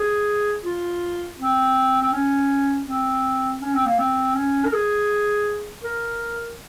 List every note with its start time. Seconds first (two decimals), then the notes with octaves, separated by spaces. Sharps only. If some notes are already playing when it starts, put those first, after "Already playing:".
Already playing: G#4
0.64 F4
1.39 C4
2.02 C4
2.13 C#4
2.87 C4
3.61 C#4
3.74 C4
3.86 A#3
3.98 C4
4.35 C#4
4.65 A#4
4.73 G#4
5.84 A#4